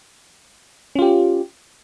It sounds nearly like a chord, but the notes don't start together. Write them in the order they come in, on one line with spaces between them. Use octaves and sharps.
C#4 F4 G4